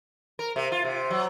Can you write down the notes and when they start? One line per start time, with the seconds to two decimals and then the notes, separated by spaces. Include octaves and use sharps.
0.39 A#4
0.56 C3
0.72 F4
0.85 C3
1.11 F#3